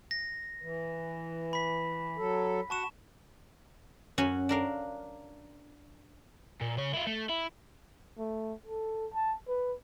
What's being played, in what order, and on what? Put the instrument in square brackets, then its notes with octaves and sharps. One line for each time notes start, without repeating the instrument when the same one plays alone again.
[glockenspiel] A#6
[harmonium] E3
[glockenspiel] B5 B6
[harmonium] F#3 A4
[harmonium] F#4 F#5 [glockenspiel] A5 C#6 E7
[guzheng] F#2 C#4 F#4
D4 A#4 F5
[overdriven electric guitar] A#2
C#3 C#5
E4 F4
A3
E4
[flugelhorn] A3
A4
A5
B4